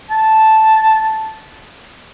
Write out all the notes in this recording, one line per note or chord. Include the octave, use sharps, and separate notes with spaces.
A5